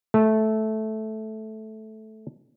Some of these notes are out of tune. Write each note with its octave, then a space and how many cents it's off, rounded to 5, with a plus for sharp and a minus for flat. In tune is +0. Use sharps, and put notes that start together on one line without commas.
A3 -10